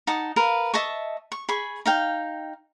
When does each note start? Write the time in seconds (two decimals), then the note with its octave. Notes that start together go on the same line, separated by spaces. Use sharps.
0.07 D#4 F#5 A5 D#6
0.36 A#4 B4 F5
0.74 D#5 E5 A5 C#6
1.32 C#6
1.49 G#4 B5 C#6
1.86 D#4 F5 G5